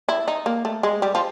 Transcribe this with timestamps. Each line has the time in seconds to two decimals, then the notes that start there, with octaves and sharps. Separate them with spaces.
0.09 E4
0.28 D#4
0.46 A#3
0.65 A3
0.83 G#3
1.02 G3
1.15 F3